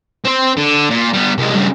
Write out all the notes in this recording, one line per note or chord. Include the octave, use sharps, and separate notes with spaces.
C4 C5
D3
A#2
G3 B3
C2 G#3
G2 C#3